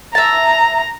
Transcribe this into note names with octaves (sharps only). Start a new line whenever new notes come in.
E5 A5 A#5